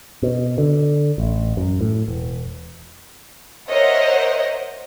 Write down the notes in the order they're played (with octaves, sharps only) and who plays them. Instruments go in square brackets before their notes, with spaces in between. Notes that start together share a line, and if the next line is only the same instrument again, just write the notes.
[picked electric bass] B2
D3
A1
F#2
A2
E1
[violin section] A#4 C5 C#5 D#5 E5 F#5